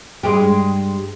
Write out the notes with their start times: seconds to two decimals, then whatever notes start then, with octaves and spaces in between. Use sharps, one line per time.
0.23 G2 G#3 G4